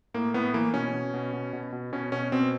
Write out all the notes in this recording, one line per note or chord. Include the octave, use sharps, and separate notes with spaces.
A2 A#3
A2 B3
E3 A#3
B2 C#4
B2
B2
B2
B2
B2
B2 C#4
B2 C#4
B2 C4